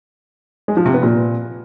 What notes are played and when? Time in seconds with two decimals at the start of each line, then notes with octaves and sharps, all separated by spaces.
0.68 G#3
0.77 F3
0.85 C3
0.94 B3
1.03 A#2